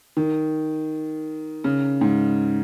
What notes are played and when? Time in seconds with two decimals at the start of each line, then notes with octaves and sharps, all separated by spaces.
0.17 D#3
1.64 C#3
2.01 G#2